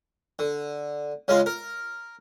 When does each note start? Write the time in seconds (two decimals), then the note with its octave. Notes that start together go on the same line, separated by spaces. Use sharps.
0.39 D3
1.28 C#3 G#3 F4
1.46 A#4